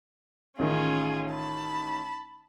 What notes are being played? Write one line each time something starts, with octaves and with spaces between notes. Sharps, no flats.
A1 D#3 C#4 F4 G#4
A5 B5